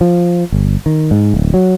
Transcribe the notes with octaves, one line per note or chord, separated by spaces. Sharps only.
F3
G1
D#3
G#2
D1
F#3